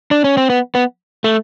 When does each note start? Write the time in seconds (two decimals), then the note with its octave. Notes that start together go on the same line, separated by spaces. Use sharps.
0.11 D4
0.24 C#4
0.37 C4
0.50 B3
0.75 B3
1.24 A3